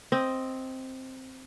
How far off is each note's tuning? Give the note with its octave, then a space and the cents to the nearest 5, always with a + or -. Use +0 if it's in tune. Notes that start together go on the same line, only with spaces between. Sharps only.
C4 +0 D#5 +5